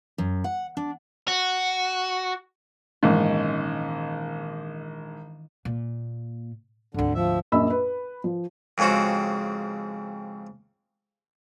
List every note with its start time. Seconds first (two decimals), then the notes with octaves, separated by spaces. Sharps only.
0.18 F#2
0.44 F#5
0.77 D4
1.28 F#4
3.03 A#1 G#2 D#3 E3 C#4
5.65 A#2
6.94 G#1 D2 D3
7.15 F3 E5
7.52 A#1 F#2 D#5 B5 E6
7.70 B4
8.24 F3
8.78 F2 G#2 C#3 C4 F#4